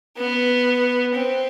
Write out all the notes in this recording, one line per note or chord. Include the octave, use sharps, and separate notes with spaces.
B3
C4